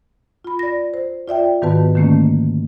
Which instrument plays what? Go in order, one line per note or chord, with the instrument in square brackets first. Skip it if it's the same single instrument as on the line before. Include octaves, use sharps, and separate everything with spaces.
[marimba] F4 B5
D5 A#6
C5
F4 D5 E5 G5
G#2 D#3 B3 F#4 B4 A5
D3 D#3 A3 A#3 C#4